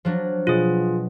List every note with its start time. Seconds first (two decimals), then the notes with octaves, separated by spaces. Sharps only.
0.05 F3 F#3 D4
0.47 B2 F4 G#4